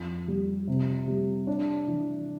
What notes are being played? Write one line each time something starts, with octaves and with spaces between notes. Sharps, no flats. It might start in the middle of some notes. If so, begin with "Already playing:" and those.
Already playing: F2
G3
C3
G3
D4
E3